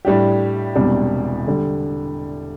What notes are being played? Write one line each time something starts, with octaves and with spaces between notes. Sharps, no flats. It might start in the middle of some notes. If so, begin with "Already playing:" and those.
A2 G3 D4 G4
E1 E2 C3 G3 D4
D3 G3